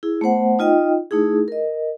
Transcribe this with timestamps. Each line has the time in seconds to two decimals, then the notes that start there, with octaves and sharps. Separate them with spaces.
0.03 E4 G#4
0.21 A3 B3 C5 F#5
0.59 D#4 F4 D#5 G5
1.11 A3 D#4 E4 G#4
1.48 A#4 D#5